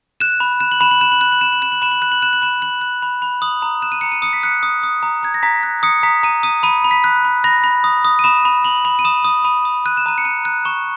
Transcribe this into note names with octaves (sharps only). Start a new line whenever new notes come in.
F#6 E7
B5
F#6 E7
F#7
B5 E7
F#7
F#6 E7
F#7
F#6 E7
F#7
F#6 E7
F#7
F#6 E7
F#7
B5 E7
F#7
F#6 E7
F#7
F#6 E7
F#7
B5 E7
F#6 F#7
F#6
B5
B5
D#6 F#7
A#5
F#6 E7
D#7
A#5 C#7
D#7
D#6 C#7
B6
F#6 C#7
D#6
D#6
A#5
A#5 G#6
A#6
A#5 B6
F#6
D#6 C#7
A#5 B6
A#5 D#7
D#6 D#7
B5 D#7
B5
B6
F#6
B5
B5 A#6
B5
D#6
D#6
D#7
B5 E7
B5
B5 F#7
B5
D#7
D#6 E7
D#6
B5 D#7
D#6
F#6 D#7
E7
A#5 D#7
C#7
A#5 D#7
F#6
C#6 E7